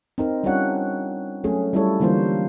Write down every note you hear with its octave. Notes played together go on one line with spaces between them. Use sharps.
C4 D#4 A#4
G3 C#4 D4 F4 C#5 F#5
F#3 A3 C#4 G#4
G3 C#4 E4 F4 A4 C#5
D3 E3 G3 A#3 F4 C5